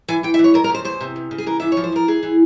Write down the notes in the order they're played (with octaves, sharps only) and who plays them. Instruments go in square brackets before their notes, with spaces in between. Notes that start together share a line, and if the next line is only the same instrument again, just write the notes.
[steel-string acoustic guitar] E3 G#5
E3 G5
E5
E3
C#5
F2 A#4
A#4
C#3 C5
E2 C5
C3
E2
C#3
G#4
E3 A#4
E3 E5
C#5
F3
C5
F3 A#4
E3 G#4
E3